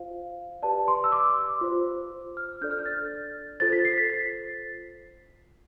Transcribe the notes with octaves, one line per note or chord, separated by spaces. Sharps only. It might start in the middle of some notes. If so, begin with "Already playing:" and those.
Already playing: F4 C5 F5
G4 B4 D5 A5
C6
E6
D6
F4 C5
F6
D4 A4 D5 G6
F6
G6
A6
F4 A4 C5 A6
B6
C7
B6
A6